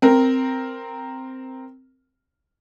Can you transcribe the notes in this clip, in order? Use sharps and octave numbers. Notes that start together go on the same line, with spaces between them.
C4 A#4